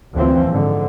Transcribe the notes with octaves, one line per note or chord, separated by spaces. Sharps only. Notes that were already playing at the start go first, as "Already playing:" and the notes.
F#1 D2 E3 F3 C4
G#2 D3